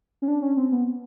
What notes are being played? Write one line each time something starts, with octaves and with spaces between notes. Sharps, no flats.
C#4
D4
C#4
C4
B3